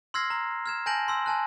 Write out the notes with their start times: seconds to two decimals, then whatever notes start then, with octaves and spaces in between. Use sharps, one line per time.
0.14 C6 E6 F6 G#6 A#6 C7
0.30 A#5
0.66 F6 G#6 E7
0.86 G#5 A5 G6 A#6 D7 F#7
1.08 C6 E6
1.26 G#5 A5 F#6